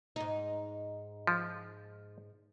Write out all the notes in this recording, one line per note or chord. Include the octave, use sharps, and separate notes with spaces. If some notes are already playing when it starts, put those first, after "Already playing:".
G#2 D#4
F3